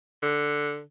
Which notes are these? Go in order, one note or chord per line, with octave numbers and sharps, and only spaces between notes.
D3